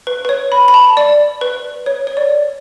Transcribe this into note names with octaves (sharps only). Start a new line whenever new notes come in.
B4
B4
C#5
B5
B5
A5
D5
B4
C#5
C#5
D5